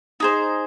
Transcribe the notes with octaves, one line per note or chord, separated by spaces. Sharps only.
D#4 G#4 C5